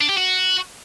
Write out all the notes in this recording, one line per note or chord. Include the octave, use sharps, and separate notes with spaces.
D4
G4
F#4